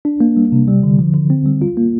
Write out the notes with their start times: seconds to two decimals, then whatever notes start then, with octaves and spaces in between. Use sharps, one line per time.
0.05 D4
0.21 A#3
0.37 G3
0.52 C3
0.68 G3
0.83 D3
0.99 F3
1.14 D3
1.30 C4
1.46 G3
1.62 F4
1.77 A#3